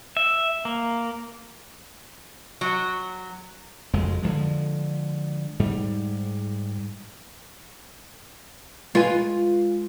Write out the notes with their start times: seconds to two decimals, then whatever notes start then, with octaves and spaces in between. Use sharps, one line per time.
0.17 E5
0.65 A#3
2.61 F#3
3.93 F#1 F2 G#3
4.22 D3 E3 F3 G#3
5.59 G#2 G3
8.95 G#3 F4 B4 G#5